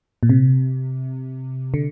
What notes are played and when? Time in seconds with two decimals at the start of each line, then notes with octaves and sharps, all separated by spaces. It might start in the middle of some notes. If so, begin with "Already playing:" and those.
0.23 A#2
0.30 C3
1.74 D3